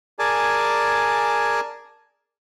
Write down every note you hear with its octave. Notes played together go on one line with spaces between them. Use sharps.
G#4 A#4 D5 G#5 A5